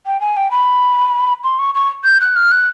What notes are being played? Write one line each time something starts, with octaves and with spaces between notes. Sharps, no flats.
G5
G#5
G5
B5
C6
C#6
C#6
G6
F#6
F6
F#6